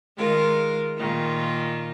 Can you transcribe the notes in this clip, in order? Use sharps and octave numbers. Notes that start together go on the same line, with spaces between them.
D#3 G#3 F4 A#4
A#2 D#3 F4